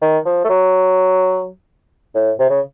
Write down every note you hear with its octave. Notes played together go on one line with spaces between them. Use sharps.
D#3
F3
A3
F#3
A2
C3
C#3